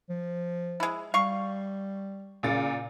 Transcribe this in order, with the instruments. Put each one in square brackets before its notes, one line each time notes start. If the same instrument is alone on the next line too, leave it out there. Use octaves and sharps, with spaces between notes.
[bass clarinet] F3
[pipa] G#3 E4
[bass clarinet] G3 [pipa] F5 C#6
[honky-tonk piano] A#2 C#3 A6